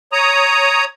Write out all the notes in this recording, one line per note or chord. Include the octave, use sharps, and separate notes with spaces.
C#5 A#5 D#6